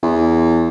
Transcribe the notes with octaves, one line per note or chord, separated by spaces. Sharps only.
E2